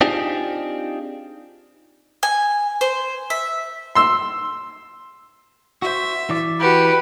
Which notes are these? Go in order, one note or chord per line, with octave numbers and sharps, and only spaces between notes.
C4 D4 D#4 F4 G4 G#4
G#5
C5
E5
C6 E6
F#4 C5 E5
E3 D5
F#4 G4 B4